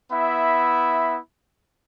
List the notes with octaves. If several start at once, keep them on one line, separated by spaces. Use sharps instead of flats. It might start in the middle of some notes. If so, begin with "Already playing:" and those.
B3 E4 E5 B5